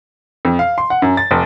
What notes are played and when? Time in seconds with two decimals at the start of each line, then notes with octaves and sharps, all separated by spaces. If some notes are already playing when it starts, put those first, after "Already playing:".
0.45 F2
0.59 F5
0.78 C6
0.90 F#5
1.02 F#2
1.17 A6
1.31 F1